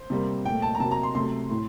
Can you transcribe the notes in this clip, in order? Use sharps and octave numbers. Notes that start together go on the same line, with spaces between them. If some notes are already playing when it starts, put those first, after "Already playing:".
Already playing: C5
C3 G3 A#3
A#2 A3 G5
A5
A#5
C3 F#3 A#3 A5
A#5
C6
C3 F#3 A3 C6
A2